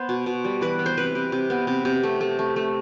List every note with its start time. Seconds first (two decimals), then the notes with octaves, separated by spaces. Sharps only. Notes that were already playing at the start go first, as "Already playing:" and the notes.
Already playing: B3 C5
0.09 B2
0.26 B2
0.45 G3
0.61 E3 B4
0.79 B3
0.86 C5
0.97 C3 B4
1.15 C3
1.32 C3
1.50 B3
1.67 C3
1.85 C3
2.03 A3
2.21 A3
2.39 A3
2.56 A3